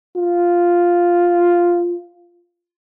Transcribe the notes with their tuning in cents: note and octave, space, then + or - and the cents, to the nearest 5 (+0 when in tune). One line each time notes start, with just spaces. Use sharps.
F4 +0